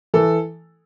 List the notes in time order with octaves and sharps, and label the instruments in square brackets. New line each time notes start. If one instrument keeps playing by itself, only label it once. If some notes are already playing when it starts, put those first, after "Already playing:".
[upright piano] E3 A4